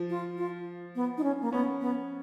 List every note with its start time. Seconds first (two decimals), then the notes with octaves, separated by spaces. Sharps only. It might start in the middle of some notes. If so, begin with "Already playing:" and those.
Already playing: F3
0.10 F4
0.38 F4
0.95 B3
1.18 D#4
1.24 C#4
1.41 A#3
1.52 B3 C#4
1.81 B3